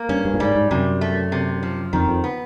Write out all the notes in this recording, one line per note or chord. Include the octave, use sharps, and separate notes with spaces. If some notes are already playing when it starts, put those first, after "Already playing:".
Already playing: A#3
G2 C#4
G2
A2
G#2 G3
G#2
F#2 C3
A3
C3
F3
F2 D#3
F2
B3